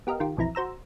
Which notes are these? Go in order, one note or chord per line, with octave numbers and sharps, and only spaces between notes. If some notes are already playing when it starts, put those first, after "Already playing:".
B3 G4 A#4 D#5 F5
D#3 F4 G4
B1 F2 E3 E4 A#5
F#4 C5 A#5 E6